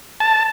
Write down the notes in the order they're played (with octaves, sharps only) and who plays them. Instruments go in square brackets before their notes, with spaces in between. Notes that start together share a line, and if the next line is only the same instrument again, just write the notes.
[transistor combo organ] A5